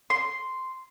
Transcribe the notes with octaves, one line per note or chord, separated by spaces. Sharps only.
C6